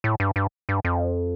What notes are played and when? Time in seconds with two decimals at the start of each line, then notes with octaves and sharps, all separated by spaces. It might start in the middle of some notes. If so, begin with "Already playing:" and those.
0.04 A2
0.20 G2
0.36 G2
0.69 G2
0.85 F2